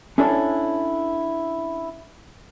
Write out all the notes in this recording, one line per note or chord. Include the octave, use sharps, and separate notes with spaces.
C#4 D4 E4 A4 C#5